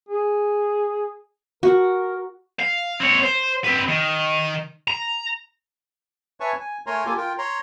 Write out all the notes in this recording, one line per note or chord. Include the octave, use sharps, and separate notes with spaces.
G#4
F#4 A#4
F5
C4 C#5
C5
C4 B4
D#3
A#5
B4 C#5 E5 G#5 A5 C#6
G#5
A3 A#4 C#5 G#5 A#5 C6
A#3 F4 G4 A4 G#5
F4 A#4 G5
C#5 A#5 C6